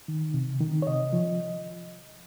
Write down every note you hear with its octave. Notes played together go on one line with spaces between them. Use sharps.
D#3
C3
D#3
C#5
C3 D#5
F3